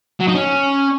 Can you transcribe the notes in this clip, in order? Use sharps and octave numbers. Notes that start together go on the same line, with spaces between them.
F#3
D#4
C#4